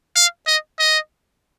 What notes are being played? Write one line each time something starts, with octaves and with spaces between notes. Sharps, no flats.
F5
D#5
D#5